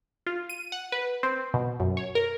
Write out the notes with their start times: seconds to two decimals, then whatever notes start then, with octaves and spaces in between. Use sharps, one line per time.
0.27 F4
0.49 D#7
0.72 F#5
0.92 B4
1.23 C4
1.54 B2
1.80 F#2
1.97 C#5
2.15 A#4